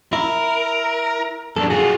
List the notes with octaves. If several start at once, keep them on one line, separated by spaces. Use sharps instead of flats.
E4 A#4
F#2 D4 A4
F4 F#4 G#4